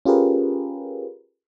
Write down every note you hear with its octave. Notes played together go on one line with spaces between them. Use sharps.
C#4 F4 G4 G#4 A#4 B4